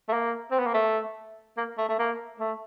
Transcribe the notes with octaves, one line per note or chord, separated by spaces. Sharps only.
A3
A#3
C4
B3
A#3
A3
A#3
A3
A3
A#3
A3